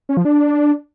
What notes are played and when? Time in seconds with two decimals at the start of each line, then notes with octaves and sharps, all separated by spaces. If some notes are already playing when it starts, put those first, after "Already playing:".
0.09 C#4
0.17 F3
0.25 D4